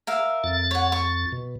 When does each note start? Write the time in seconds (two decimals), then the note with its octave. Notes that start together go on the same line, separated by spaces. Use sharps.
0.07 A#4 E5 F5
0.44 F2 A6
0.71 C#5 F#5
0.92 C#6
1.32 B2